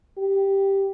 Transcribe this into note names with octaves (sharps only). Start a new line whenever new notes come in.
G4